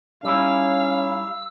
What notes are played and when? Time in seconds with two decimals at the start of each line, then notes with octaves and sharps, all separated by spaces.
0.25 G3 C#4 D#4 E4 F5 E6